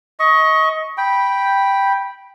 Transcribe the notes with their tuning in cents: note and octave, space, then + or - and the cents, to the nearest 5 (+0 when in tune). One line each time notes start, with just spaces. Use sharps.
D#5 +25 C#6 +0
G5 +0 B5 -10